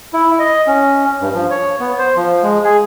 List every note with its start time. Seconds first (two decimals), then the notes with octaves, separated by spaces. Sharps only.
0.14 E4
0.39 D#5
0.67 C#4
1.21 G2
1.34 F3
1.50 C#5
1.80 B3
1.99 C5
2.16 F3
2.43 G#3
2.64 G#4